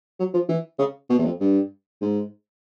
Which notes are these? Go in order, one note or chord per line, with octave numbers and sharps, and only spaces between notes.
F#3
F3
E3
C#3
B2
E2
F2
G2
G#2